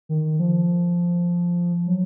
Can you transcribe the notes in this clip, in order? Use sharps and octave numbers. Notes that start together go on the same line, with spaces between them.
D#3
F3
F#3